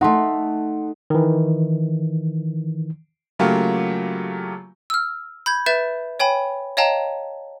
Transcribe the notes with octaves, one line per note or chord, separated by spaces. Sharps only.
A3 D#4 F#5 C6
D#3 E3
C#3 F#3 A3 A#3 F4 G4
E6 F6
B5 G6 G#6
B4 E5 G6 A6 E7
C#5 G5 G#5 B5
C#5 D#5 F5 G5 A5 A#5